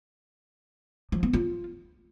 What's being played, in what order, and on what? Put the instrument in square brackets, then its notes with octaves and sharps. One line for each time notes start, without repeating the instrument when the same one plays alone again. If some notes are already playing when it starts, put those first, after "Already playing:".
[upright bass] F3
B3
F4